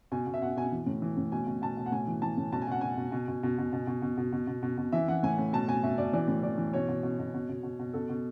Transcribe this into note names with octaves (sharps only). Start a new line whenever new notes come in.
B2 G#5
B2
E5
B2 F#5
B2 G#5
E3
A2
E3
A2
B2 G#5
B2
B2 A5
B2
F#5
A2 G#5
E3
E3 A5
A2
B2 A5
G#5
B2 F#5
B2 G#5
B2
B2
B2
B2
B2
B2
B2
B2
B2
B2
B2
B2
B2
E3 E5
E3 F#5
A2 G#5
A2
B2 A5
B2 G#5
B2 E5
B2 D5
E3 D5
A2
E3 D5
E3
B2 C#5
B2
B2
B2
B2
B2
B2
B2
B2 A4
B2